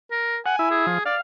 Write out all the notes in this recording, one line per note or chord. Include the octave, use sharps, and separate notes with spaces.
A#4
F#5 G#5
E4
G#4
F3
D5 F5